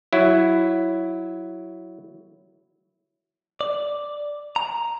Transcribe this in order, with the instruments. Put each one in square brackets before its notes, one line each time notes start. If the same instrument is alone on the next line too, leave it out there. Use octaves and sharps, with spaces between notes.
[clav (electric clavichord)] F#3 E4
[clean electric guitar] D5
A#5